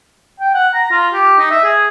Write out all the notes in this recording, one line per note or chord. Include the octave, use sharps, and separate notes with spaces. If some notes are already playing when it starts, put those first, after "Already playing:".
G5
F#5
A#5
F4
G4
D#4
E5
G#4